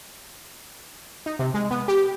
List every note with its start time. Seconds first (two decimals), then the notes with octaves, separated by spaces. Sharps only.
1.26 D#4
1.39 C3
1.54 G#3
1.71 B3
1.88 G4